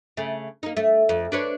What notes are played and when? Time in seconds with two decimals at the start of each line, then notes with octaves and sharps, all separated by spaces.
0.17 C#3 A3
0.63 A#3 D#4
0.77 A3
1.09 F2
1.32 D4 B4 C#5